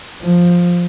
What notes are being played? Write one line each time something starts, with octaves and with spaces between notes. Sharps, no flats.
F3